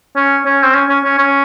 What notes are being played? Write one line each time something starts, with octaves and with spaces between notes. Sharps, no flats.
C#4
C#4
C4
C#4
C#4
C#4
C#4